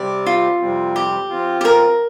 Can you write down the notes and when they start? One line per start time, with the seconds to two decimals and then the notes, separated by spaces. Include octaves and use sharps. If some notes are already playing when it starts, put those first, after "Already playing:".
Already playing: C3 G3 C4 G4 D5
0.27 F4
0.60 F2 C3 G3 C4
0.96 G4
1.30 F3 C4 F4
1.61 G4
1.65 A#4